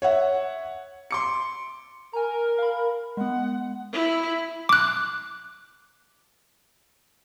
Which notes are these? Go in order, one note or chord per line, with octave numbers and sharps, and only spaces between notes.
C#5 E5 F#5
C6 D6 C#7
A#4 G#5 A#5
F5 B5
G#3 B3 F#5
E4
D6 F#6